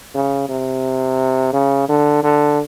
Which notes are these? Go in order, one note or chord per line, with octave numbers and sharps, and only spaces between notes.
C#3
C3
C#3
D3
D3